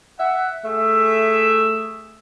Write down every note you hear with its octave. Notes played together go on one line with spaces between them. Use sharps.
E5 F#5
A3 G#4 E5